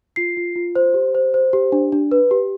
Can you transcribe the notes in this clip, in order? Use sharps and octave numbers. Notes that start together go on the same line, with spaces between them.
F4 C7
F4
F4
C5
G4
C5
C5
G4
D4
D4
B4
G4